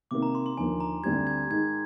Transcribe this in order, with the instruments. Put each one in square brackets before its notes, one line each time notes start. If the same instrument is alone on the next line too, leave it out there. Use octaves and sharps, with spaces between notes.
[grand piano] C3 D#3 A#3 [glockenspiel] D6
[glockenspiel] A#5
C6
C6
[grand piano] D#2 D3 F3 A#3 [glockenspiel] G#5
[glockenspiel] A#5
[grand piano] D2 D3 G3 C4 G4 [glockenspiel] G#6
[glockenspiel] G#6
[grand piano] G#2 D#3 G#3 [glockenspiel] G#6